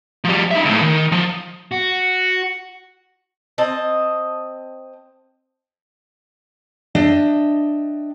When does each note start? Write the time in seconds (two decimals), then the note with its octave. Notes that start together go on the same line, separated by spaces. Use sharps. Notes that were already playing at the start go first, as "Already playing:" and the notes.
0.24 F3 G3
0.51 D#4 E5
0.65 C#2 A2
0.81 D#3
1.12 F3
1.72 F#4
3.58 C4 D#5 A5
6.95 D4 D#5 E5 G5